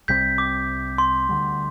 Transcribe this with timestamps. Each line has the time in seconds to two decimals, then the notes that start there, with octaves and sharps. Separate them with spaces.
0.08 C2 C3 G3 C4 G6 B6
0.38 D6
0.98 C6
1.29 D2 D3 G3